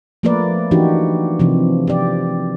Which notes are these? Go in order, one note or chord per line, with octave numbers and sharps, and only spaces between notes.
F3 A3 A#3 A#4 B4 D5
E3 D4 D#4 F#4 G4
C3 E3 F3
G4 D5